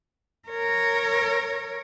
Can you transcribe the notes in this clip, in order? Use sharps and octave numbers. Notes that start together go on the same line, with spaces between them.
A#4 C#5